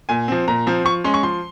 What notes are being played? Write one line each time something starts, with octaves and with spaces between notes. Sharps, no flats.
A#2 G#5
F3 C4
A#2 A#5
F3 C4
F3 C#6
G#3 C#4 C6
C#6
F3 C6